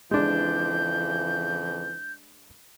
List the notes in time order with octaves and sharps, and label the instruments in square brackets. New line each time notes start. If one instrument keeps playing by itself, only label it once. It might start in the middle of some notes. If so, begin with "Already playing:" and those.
[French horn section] F2 C#3 E3 [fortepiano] G#3 D4 [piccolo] G6